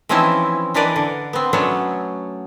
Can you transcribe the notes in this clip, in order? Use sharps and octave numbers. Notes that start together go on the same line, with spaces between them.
E3 F3 C4 C#4 D#4 E4
E3 D4 A#4 B4 D5 D#5
D3
B3 C4
F#3 A3 B3 C#4 D4